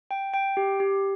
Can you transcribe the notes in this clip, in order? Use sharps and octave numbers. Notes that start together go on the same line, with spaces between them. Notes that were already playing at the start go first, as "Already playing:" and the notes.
G5
G5
G4
G4